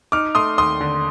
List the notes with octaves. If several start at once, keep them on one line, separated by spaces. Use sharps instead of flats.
D#4 D6 F6
A3 C6 D#6
D#2 C6 D#6
D3